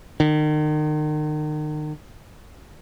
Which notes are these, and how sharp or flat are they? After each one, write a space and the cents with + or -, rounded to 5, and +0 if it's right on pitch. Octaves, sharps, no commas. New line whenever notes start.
D#3 -35